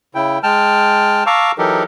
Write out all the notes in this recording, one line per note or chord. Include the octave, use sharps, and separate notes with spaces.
C#3 E4 G5
G#3 G5 A5 F6
F5 A5 A#5 C#6 D6 E6
E3 F#3 D#4 G4 A4 A#4